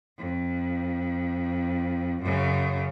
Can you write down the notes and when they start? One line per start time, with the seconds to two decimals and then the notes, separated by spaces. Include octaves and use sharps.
0.18 F2
2.22 F#2 C#3